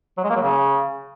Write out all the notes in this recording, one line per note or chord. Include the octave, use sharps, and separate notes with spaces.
F#3
G#3
A#3
F#3
C#3